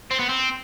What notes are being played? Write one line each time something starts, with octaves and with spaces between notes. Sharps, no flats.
C4
B3
C4